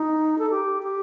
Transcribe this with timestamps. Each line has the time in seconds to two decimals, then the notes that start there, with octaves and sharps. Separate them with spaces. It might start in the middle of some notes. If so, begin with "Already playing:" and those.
Already playing: D#4
0.39 A4
0.50 G4
0.83 G4